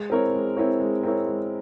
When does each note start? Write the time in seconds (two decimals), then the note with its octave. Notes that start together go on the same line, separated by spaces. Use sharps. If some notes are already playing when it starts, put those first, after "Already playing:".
Already playing: G#3
0.10 C4 E4 A#4 C#5
0.34 G#3
0.57 C4 E4 A#4 C#5
0.80 G#3
1.03 C4 E4 A#4 C#5
1.27 G#3